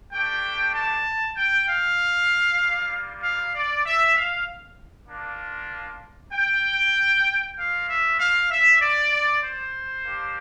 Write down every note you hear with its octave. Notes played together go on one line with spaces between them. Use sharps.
A3 D4 G4 G5
A5
G5
F5
G3 A#3 F4
F5
D5
E5
F5
A#3 D4 F4
G5
A#3 F4 F5
E5
F5
E5
D5
C5
A#3 D4 G4